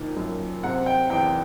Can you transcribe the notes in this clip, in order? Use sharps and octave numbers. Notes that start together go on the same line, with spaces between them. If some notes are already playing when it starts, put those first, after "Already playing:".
Already playing: A#2 D#3 F3
F#2
C3 F#5
G5
E2 G5